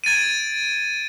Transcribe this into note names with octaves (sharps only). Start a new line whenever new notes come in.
G#6 A6 D7 D#7